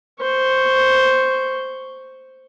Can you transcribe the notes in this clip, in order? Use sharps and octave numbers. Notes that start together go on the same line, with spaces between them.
C5 C#6